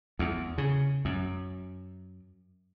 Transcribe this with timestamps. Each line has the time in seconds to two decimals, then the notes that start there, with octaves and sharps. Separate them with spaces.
0.19 E2
0.58 C#3
1.05 F#2